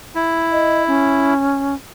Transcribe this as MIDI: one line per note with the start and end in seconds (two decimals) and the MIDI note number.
0.15 1.34 64
0.52 0.83 75
0.87 1.75 61